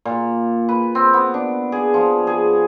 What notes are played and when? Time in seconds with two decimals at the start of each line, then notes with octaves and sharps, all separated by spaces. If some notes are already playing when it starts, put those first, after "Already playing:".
0.05 A#2
0.69 B4
0.95 C4
1.14 B3
1.34 D4
1.72 G#4
1.94 F3
2.27 G#4